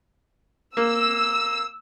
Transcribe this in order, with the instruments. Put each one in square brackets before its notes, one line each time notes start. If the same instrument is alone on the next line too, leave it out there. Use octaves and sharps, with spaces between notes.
[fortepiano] A#3 [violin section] E6